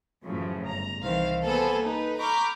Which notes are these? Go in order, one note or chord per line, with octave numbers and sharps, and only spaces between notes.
F#2 A2 C#3 E3 F3
G1 A#5
C2 D#3 E3 C5 F5
A#3 B3 G#4 A4 C5
D#4 B4
A#5 B5 C#6 D6 F6 G6